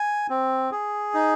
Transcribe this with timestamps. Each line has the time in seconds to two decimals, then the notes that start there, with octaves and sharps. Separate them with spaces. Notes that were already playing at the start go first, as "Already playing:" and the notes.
Already playing: G#5
0.30 C4
0.72 G#4
1.14 D#4